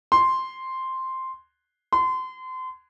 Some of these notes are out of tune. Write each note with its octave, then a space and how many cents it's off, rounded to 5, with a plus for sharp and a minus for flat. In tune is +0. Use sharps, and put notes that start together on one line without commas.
C6 +0
C6 -30